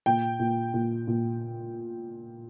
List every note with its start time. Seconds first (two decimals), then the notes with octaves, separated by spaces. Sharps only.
0.06 A#2 G5
0.40 A#2
0.74 A#2
1.07 A#2